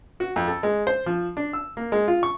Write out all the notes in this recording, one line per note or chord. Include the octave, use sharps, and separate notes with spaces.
F#4
F2
A4
G#3
C5
F3
D4
E6
A#3
G#3
F4
C#6